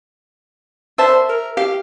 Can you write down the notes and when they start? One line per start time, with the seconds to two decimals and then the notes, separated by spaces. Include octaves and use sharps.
0.98 C5 E5 A5
1.29 A#4
1.57 G4 F5